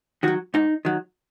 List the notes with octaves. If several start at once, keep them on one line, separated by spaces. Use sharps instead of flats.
D#3 F#3 F#4
G#2 D#4
D#3 F#3